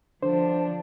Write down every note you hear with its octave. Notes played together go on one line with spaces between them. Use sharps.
D3 F3 D4 C5